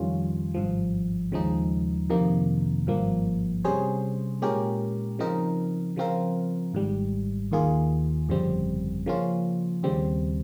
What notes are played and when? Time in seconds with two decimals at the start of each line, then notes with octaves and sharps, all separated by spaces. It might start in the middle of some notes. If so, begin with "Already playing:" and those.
Already playing: F2 D#3 G3 C#4 F4
0.54 G#1 G2 F3
1.32 D#2 C#3 F3 G#3 D#4
2.10 F2 C3 D#3 A#3 D#4
2.87 G#1 G2 F3 A#3
3.65 C3 G3 C#4 G#4 C5
4.42 A#2 G#3 C#4 G4 A#4
5.19 C#3 F3 C4 D#4 A#4
5.96 C#3 F3 C4 F4 A#4
6.74 G#1 G#2 G3
7.51 D#2 D#3 A#3 F4 G#4
8.29 G1 F2 C#3 G3 C4
9.06 C#3 F3 A#3 C#4 F4
9.83 D#2 C#3 G3 C4